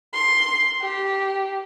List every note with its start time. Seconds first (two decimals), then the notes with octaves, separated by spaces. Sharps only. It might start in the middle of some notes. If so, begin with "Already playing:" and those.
0.13 C6
0.81 G4